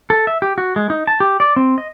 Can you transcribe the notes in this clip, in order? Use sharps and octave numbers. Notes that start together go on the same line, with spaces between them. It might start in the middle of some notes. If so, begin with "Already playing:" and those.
A4
E5
G4
F#4
G#3
D#4
A5
G4
D5
C4
D#5